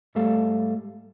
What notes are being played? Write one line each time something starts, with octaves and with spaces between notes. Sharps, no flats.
G#2 G3 A3 A4 F5